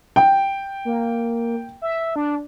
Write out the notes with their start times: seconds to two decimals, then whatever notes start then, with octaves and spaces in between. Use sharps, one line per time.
0.16 G5
0.85 A#3
1.82 E5
2.16 D4